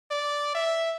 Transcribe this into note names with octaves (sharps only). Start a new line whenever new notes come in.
D5
E5